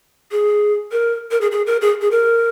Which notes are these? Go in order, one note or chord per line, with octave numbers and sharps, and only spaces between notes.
G#4
A#4
A#4
G#4
G#4
A#4
G#4
G#4
A#4